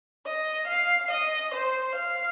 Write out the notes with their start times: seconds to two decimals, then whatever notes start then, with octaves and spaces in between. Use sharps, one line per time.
0.24 D#5
0.66 F5
1.09 D#5
1.52 C5
1.94 F5